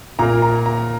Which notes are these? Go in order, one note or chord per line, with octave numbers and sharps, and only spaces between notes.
A#2 A#3 A#5
A#5
A#5